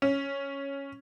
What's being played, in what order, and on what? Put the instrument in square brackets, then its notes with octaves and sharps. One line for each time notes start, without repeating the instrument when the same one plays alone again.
[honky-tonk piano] C#4